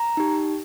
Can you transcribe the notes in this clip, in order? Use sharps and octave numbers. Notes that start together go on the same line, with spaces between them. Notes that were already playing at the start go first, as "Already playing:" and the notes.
Already playing: A#5
D#4 G4